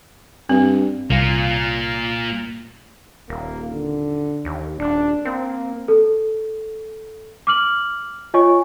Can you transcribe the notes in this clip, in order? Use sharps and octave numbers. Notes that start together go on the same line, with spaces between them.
G2 C4
C2 A#3 F4
D#1 A#3
D3
D#2
D#1 D4
A#3 C4
A4
D6 F6 F#7
F4 C#5 D#5 G#5 C#6